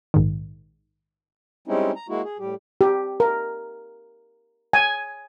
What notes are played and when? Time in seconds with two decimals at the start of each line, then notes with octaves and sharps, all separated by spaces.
0.14 A#1 G#2 D#3
1.68 G3 G#3 C4 C#4 D#4 E4
1.96 A#5
2.09 G#3 A#3 E4 F#4
2.24 G#4
2.39 A2 G3 G4
2.81 G4
3.20 A#4
4.73 G#5